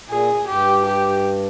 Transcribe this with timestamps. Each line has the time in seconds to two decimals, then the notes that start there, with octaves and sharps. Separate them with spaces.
0.09 A#2 G#4
0.47 G2 G4
0.85 G4